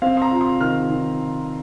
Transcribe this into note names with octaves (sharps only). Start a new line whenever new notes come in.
C4 F5
C6
A#5
F4
C6
D#3 F6
D#3